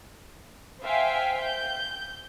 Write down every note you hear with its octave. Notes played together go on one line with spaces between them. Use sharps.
C5 E5 F5 G5 G#5
G6